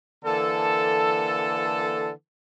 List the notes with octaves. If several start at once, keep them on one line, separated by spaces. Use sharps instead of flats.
D3 E3 A#3 A4